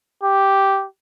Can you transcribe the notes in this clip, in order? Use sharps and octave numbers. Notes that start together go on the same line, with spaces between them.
G4